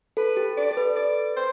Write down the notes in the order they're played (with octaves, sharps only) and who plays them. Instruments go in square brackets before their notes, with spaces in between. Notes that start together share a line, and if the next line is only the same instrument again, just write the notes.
[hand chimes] A4 [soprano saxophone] B4
[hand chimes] G4
[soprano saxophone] D5
[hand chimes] A4
B4
[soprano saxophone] D5
C5